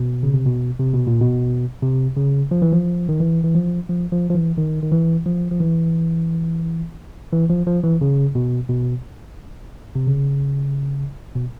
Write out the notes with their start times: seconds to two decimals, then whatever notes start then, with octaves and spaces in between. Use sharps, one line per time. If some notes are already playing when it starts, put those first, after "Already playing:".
Already playing: B2
0.23 C#3
0.34 C3
0.46 B2
0.80 C3
0.93 B2
1.07 A#2
1.21 B2
1.82 C3
2.17 C#3
2.51 F3
2.62 E3
2.73 F3
3.09 D#3
3.20 E3
3.44 E3
3.55 F3
3.89 F3
4.12 F3
4.30 F3
4.35 E3
4.58 D#3
4.83 D#3
4.92 E3
5.26 F3
5.51 F3
5.60 E3
7.32 E3
7.50 F3
7.67 F3
7.83 E3
8.01 C#3
8.35 B2
8.70 B2
9.95 C3
10.07 C#3
11.35 B2